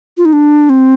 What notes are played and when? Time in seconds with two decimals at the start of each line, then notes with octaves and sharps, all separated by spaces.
0.17 F4
0.25 D#4
0.33 D4
0.69 C4